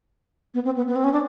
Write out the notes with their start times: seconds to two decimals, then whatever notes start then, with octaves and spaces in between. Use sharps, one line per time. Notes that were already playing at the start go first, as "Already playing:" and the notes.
0.54 B3
0.65 C4
0.77 B3
0.88 B3
0.96 C4
1.04 C#4
1.13 D4